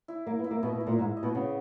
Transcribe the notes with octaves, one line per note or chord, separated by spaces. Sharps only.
E4
A#3 E4
B3
E4
A#3
B2 D#5
B2
E4
A#2
G#2 D#5
D#5
B2
C#3 B3